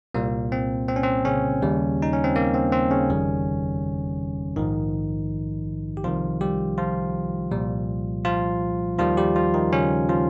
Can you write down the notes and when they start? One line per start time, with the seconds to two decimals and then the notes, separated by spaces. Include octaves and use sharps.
0.14 C2 A#2 G3 A#3
0.52 C4
0.88 C4
0.96 C#4
1.03 C4
1.25 C#3 C#4
1.62 D#2 C#3 G3
2.02 D#4
2.13 C#4
2.24 C4
2.36 A#3
2.54 C4
2.72 C4
2.91 C#3 C#4
3.10 G1 F2 D#3 G3
4.56 A#1 G#2 D#3 F3 D#4
5.97 G4
6.04 C2 C3 D#3 F3 F4
6.41 G3 G4
6.78 F3 F4
7.51 C2 A#2 G3
8.25 F3 F4
8.98 D#2 D#3 F3 G3 F4
9.17 G3 G4
9.35 F3 F4
9.54 D#3 D#4
9.73 C#3 C#4
10.09 F3 F4